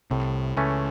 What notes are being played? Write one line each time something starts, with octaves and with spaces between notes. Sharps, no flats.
C2 A2 C3
C#2 C#3 E3 A3 C#4